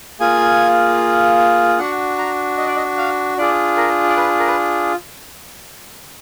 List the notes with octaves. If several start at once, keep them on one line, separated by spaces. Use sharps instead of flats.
A#3 F4 G#4 G#5
D4 F#4 F#5
A#5
D#5
D5
D#5
F5
D4 F4 G#4 D5
A#4
D5
B4
A#4
B4